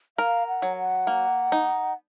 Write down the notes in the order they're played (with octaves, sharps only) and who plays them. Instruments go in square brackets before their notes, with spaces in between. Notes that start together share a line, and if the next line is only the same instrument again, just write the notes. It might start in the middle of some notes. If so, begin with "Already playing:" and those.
[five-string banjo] A#4 [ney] F5
[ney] F#5
[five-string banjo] F#3
[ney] F#5
[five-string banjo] A#3
D#4